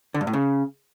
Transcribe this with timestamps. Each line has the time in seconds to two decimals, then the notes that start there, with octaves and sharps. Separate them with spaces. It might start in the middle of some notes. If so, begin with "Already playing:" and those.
0.14 D3
0.21 G2
0.27 A2
0.33 C#3